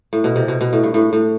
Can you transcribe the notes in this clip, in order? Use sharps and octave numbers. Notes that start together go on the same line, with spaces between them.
A2
B2
C3
B2
B2
A2
G2
A2
A2